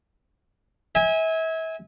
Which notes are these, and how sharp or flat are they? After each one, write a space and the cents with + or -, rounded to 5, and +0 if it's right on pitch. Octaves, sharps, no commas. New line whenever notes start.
E5 -35 G#5 -10